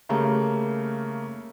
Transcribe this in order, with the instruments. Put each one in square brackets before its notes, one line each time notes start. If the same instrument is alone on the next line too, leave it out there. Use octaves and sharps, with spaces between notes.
[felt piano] C#3 G3 A3 A#3